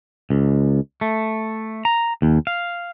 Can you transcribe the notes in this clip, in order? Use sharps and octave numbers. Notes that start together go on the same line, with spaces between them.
C#2
A3
A#5
D#2
F5